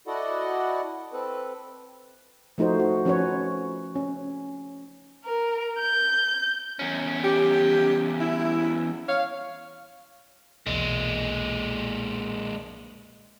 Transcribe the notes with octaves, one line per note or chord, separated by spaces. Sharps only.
E4 F#4 A4 D5 D#5 F#5
C4 A4 B4
F3 A3 D#4 F#4 C5
F#4
F3 C#4 F#4 B4 C#5
C#4
A#4
G6
E2 C#4
G4
E4
C#5 F5
B1 E2 A#2 G#3